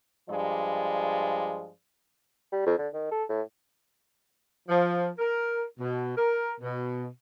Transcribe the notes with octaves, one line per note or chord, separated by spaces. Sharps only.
G2 F3 G#3 D5
G3
F2
D3
D#3
A4
A2
F3
A#4
B2
A#4
B2